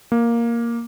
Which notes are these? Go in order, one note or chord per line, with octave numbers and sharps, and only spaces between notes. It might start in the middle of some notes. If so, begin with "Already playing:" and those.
A#3